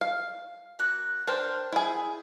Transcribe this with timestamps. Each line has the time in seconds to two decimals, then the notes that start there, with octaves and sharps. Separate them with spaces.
0.01 F5
0.79 A#3 F#4 F#6
1.27 D4 A#4 C5 G5
1.72 E4 G#4